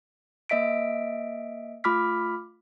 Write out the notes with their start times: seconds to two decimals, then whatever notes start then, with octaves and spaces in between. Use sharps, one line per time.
0.49 A#3 D#5 E5 B6 D7
1.84 A3 F4 B5 D6 F6 B6